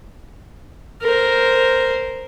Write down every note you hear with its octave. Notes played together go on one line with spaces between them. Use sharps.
A#4 C5